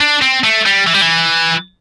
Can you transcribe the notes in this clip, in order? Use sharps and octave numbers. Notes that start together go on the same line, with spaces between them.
D4
C4
A3
G3
E3
G3
E3